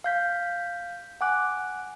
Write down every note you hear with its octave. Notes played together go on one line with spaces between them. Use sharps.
F5 G6 B6
F#5 G#5 D6 F#6